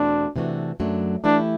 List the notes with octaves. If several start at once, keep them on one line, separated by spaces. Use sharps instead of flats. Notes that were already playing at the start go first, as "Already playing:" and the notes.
Already playing: E2 B2 A3 C4 D4 F#4
C3 E3 A3 D4 F#4
F#2 F#3 A3 D4
E3 A3 D4 E4 G4